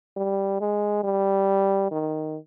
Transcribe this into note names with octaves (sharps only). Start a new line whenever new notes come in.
G3
G#3
G3
D#3